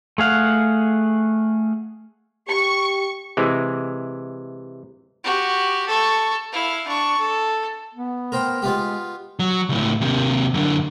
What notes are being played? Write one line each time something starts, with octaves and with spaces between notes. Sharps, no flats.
A3 G#4 F5 F#5
G4 C#6
C3 E3 G#3
F#4 G4
A4 C#6
E4 F5
D4 C#6
A4
B3
A#4 C5 G5
G#3 B3 F4 G4
F#3
C#2 A2
D#2 C3
F#2 D3